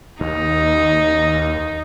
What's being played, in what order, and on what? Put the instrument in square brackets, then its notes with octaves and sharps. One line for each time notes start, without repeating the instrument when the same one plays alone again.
[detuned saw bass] D#2 [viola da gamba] D#4